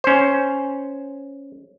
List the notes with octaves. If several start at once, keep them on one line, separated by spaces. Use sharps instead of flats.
C#4 C5